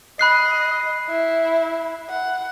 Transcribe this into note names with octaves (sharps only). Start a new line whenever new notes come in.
D#5 B5 F#6 C7
E4
F#5